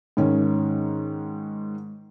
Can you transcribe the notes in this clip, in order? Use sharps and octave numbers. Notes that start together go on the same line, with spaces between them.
G#2 D#3 C#4